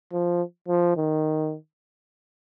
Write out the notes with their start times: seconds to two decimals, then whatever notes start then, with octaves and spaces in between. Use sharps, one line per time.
0.12 F3
0.68 F3
0.97 D#3